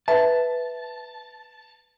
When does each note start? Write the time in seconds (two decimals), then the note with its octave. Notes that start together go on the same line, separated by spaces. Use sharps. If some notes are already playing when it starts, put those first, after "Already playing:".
0.08 B4 E5 A5